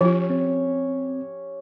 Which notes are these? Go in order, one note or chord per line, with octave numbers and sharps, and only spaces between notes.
F3 C#4 F4 G4 C#5
C4